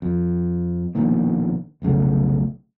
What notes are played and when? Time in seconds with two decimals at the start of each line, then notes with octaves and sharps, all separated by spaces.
0.02 F2
0.95 A#1 B2 D#3 A#3
1.82 F1 B1 C#3 A3